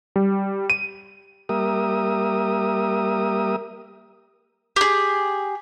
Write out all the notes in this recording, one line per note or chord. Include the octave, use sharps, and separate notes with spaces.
G3
D#7
G3 A#3 G4 A#4 E5 D#6
G4 G#4